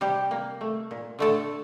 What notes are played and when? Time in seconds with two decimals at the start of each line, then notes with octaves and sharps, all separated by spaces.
0.01 C3 G3 G4
0.31 A#3
0.61 A3
0.91 A#2
1.19 D3 A3 A4